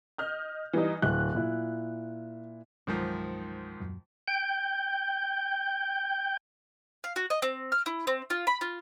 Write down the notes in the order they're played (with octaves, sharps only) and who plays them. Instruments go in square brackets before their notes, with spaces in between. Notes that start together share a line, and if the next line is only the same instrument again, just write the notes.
[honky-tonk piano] D#5 F6 G6
E3 G3 D#4
[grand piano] D1 [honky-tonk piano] F#6
[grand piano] A#2 E4
[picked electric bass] G1 C2 F#3 [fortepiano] G#2 D#3 F3
[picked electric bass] D#1 F#2
[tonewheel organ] G5 G6
[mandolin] F5
F#4
D#5
C4
F6
E4
C4
F4
B5
F4